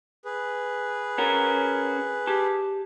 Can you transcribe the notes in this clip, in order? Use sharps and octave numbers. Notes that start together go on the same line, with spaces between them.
G#4 B4
C#4 F#4 A#4
G4 A5